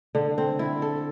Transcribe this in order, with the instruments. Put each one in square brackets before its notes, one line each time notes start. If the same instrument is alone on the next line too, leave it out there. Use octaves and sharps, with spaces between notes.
[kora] D3
C4
E4
A4